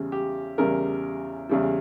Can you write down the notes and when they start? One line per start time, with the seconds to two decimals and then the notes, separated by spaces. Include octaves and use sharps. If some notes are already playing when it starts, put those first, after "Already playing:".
Already playing: E2 C#3 G3
0.12 G4
0.58 E2 C#3 G3 A#4
1.49 E2 C#3 G3